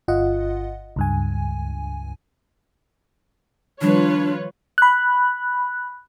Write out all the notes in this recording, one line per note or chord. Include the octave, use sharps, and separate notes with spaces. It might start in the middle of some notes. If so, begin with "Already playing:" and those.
G1 F4 D#5 F#5
C#2 G2 G#5
D#3 F3 G3 D4 F4 B4 C#5
B5 F#6